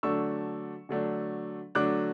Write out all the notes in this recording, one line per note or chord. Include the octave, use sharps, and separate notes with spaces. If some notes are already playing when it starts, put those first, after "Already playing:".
D3 F#3 A3 D4 C#6 E6
D3 F#3 A3 D4
D3 F#3 A3 D4 D6 F#6